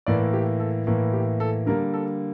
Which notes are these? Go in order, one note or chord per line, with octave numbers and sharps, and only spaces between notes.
A2 E3 A#3 D5
G4
A4
A2 E3 A#3
G4
A4
D3 G3 A#3 A#4
A4